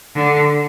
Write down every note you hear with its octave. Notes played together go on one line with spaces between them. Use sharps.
D3